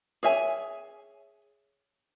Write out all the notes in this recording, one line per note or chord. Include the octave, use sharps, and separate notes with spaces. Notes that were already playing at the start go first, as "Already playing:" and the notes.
G#4 C#5 E5 G#5